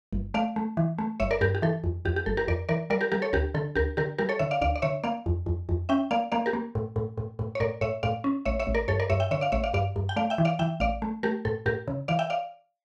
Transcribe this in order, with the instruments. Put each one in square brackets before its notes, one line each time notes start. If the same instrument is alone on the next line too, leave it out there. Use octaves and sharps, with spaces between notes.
[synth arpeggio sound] G1
A3 D5 F5
A3
E3
A3
G1 C#5 E5
A#4 D5
G2 G4 A#4
G4
E3 A4
F2
F2 G4
G4
G1 A4
G4 A#4
F2 A#4 D5
E3 A#4 D5
G3 A#4 D5
G4 A#4
G3 G4 A#4
A4 C#5
D2 G4 A#4
D3 A4
D2 G4 A#4
D3 G4 A#4
G3 G4 A#4
A4 C#5
D3 C#5 E5
D5 F5
D2 D5 F5
D5
D3 C#5 E5
A#3 D5 F5
F2
F2
F2
C#4 E5 G5
A#3 D5 F5
A#3 D5 F5
G4 A#4
A#3
A2
A2
A2
A2
C#5
A2 A#4 D5
A2 C#5 E5
A2 D5 F5
C#4
A1 C#5 E5
C#5 E5
A1
A#4 D5
G2 A4 C#5
A#4 D5
G2 C#5 E5
E5 G5
D3 C#5 E5
D5 F5
A1 C#5 E5
D5 F5
G2 D5 F5
G2
G5
A3 D5 F5
E5 G5
E3
D5 F5
E3 E5 G5
A1 D5 F5
A3
A3 G4 A#4
A2 A4
A2 G4 A#4
C#3
E3 D5 F5
E5 G5
D5 F5